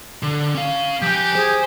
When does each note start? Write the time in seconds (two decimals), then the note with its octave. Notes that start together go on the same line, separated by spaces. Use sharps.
0.23 D3
0.55 C#4 F5
1.02 F3 G4 G#5
1.35 G#4 C5